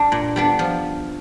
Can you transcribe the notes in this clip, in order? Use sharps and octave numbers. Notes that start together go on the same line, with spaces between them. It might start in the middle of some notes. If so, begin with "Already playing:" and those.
Already playing: G3 D4
A#2
G3 B3 D4
F3